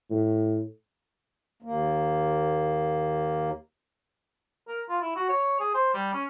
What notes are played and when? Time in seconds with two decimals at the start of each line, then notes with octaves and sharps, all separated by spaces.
0.10 A2
1.62 D#2 A#3
4.68 A#4
4.89 F4
5.01 E4
5.16 F#4
5.29 C#5
5.60 G#4
5.74 C5
5.94 G3
6.13 C#4